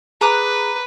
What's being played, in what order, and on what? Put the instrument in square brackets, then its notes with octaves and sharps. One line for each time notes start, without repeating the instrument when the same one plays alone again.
[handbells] G#4 [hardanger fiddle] B4 [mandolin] A#5 D6 F#6